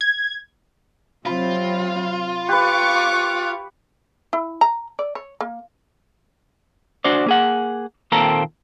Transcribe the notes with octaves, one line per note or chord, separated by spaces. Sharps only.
G#6
C3 F#3 C4 F4 B5
G4 B4 F5 C#6 D6 F#6
E4
A#5
D5
C#5
A#3
D4 F#4 C5 D5
A#3 G#4 F#5
D#2 A#2 A#3 C4 A4 A#5